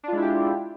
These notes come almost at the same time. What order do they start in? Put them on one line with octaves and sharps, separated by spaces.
D4 F4 G#3 E4 G4